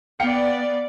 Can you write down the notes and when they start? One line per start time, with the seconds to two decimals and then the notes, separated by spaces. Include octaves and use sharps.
0.20 B3 D5 F5 G5 C#7